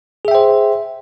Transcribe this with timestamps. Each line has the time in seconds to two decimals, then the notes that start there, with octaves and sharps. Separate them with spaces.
0.25 G#4
0.28 E5
0.31 G5
0.35 C5